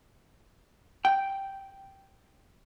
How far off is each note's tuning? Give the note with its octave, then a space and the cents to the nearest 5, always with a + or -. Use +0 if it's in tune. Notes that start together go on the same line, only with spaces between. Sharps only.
G5 -5